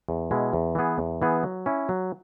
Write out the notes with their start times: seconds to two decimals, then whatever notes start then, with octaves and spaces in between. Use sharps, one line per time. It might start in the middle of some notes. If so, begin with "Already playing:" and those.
0.09 E2
0.31 B2 G#3 E4
0.53 E2
0.75 E3 B3 G#4
0.98 E2
1.22 E3 B3 G#4
1.43 F#3
1.66 C#4 E4
1.89 F#3